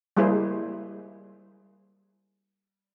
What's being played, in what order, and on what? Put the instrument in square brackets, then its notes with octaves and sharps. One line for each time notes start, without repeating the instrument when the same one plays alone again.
[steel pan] G3 G#3 A#3 E4 G#4 C5